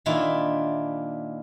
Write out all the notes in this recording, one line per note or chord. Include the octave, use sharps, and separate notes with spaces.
A#2 D#3 D4 E4 F4